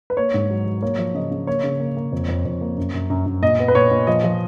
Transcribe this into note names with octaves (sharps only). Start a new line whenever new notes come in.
B4
A#3 C#5
G#2
F#3
F#3
A#3 C#5
F3
C#3 D#5
C#3
A#3 C#5
C#3
A#3
A#3
F2
F2
F2
A#3
F#2
F#2
F#2
F#2
A#2 D#5
B3
B4
A#2 C#5
A#2
F3 D#5
F3